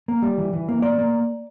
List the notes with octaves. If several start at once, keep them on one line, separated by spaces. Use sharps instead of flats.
A#3
G3
E3
E3
A#3
A#3 D5
A#3